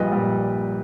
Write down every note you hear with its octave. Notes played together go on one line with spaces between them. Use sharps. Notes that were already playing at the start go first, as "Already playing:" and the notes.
Already playing: A#1 A#2 G3 B4 D#5
A#1 A#2 G3